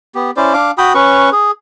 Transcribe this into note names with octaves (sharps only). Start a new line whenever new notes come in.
B3 G4
C#4 E4 C5 D5
D4 F5 D6
F#4 G5 B5 D#6
C#4 B4 C#6
G#4